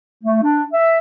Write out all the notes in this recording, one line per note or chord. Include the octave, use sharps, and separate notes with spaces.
A3
D4
E5